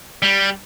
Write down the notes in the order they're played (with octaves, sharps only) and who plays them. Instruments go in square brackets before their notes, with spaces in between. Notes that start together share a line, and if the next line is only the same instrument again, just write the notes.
[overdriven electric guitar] G3